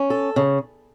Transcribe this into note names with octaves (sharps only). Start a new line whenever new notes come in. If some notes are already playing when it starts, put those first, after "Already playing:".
Already playing: C#4
A4
C#3